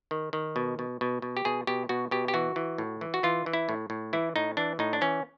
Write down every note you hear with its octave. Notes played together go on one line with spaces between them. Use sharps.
D#3
D#3
B2
B2
B2
B2
G4
B2 G#4
B2 G4
B2 F#4
B2 G4
G4
E3 F#4
E3
A2
E3
F#4
E3 F4
E3
E4
A2
A2
E3 E4
A2 D#4
E3 D4
A2 D#4
D4
E3 C#4